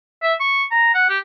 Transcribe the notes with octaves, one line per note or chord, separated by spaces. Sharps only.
E5
C#6
A#5
F#5
G4